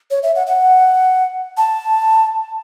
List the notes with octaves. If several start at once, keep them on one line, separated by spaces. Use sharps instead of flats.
C#5
E5
F#5
F#5
A5